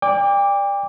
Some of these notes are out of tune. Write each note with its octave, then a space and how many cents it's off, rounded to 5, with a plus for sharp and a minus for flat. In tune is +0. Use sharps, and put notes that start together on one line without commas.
D5 +0 G5 +40 D6 -5